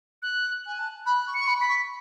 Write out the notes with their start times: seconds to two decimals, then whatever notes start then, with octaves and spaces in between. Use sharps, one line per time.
0.22 F#6
0.65 G#5 F#6
0.79 A5
1.06 B5 F#6
1.27 C#6
1.34 C#7
1.40 C#6
1.47 B5
1.59 B5 B6
1.68 C#6